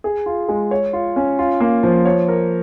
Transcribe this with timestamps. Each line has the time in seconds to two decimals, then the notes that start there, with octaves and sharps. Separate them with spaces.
0.04 G#4
0.26 F4
0.49 G#3
0.71 C#5
0.93 F4
1.16 C#4
1.39 F4
1.60 A#3
1.83 F3
2.05 C#5
2.28 A#4